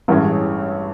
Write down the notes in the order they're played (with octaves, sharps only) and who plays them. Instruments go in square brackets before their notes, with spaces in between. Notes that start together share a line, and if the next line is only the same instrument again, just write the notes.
[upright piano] A1 G2 E3 G#3 C#4